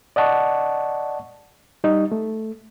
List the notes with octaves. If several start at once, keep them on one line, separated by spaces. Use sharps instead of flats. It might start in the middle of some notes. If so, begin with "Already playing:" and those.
D5 D#5 F#5 A5 C#6
G3 D#4 D#5
A3